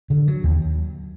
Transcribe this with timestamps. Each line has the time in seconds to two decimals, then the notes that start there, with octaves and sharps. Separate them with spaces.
0.10 D3
0.28 F#3
0.44 D#2